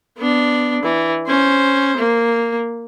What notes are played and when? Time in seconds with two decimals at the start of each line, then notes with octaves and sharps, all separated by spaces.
0.18 B3 D4
0.83 E3
1.27 C#4 C5
1.97 A#3